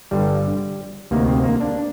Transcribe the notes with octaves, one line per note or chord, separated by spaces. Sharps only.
G1 G2 D3 G3
D2 C3 D#3 A#3
C4
A#3
D4